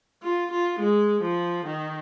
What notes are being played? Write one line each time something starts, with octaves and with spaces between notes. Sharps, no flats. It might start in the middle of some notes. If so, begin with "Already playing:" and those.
F4
F4
G#3
F3
D#3